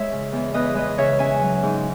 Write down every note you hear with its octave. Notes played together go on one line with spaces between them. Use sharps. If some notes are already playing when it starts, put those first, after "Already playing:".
Already playing: G#3 C#5 E5
C#3
E2
E2 B4 D#5
G#3 B4 D#5
C#3 C#5 E5
C#4 E5 G#5
F#3
G#2